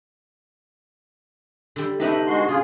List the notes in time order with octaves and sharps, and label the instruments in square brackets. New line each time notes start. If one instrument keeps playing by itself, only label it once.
[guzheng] D3 G3
[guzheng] B3 D4 G4 [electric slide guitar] D#4 B4 [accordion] E5
[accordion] G#3 F#4 C6
[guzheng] C#3 [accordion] F4 G#4